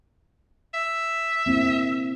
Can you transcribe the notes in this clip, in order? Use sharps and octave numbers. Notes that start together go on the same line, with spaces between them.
E5
A#3 C4 E4